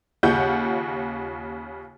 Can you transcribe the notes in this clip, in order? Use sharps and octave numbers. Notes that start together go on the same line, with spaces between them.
D#2 C#3 F4 F#5 G6